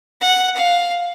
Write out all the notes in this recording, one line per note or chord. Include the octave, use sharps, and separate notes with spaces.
F#5
F5